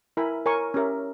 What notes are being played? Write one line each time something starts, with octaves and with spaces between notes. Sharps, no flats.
E4 A#4 E5 G#5 B5
A#4 C#5 G#5 C#6
C#4 G4 A#4 E5